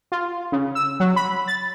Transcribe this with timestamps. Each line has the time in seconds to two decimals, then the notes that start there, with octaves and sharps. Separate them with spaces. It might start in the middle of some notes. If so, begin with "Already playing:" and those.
0.12 F4
0.52 C#3
0.75 E6
1.00 F#3
1.16 B5
1.48 A6